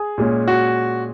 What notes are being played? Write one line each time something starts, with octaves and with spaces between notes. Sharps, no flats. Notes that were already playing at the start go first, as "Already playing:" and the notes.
Already playing: G#4
A#2 G#3 C#4
F#4